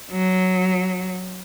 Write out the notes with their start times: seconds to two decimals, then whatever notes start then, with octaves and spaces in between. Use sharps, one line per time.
0.12 F#3